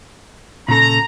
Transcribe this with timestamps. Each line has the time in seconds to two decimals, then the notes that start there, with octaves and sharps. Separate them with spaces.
0.68 A#2 C#3 A4 A#5